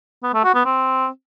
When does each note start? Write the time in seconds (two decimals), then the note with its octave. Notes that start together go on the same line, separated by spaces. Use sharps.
0.23 B3
0.34 A3
0.44 F#4
0.55 B3
0.65 C4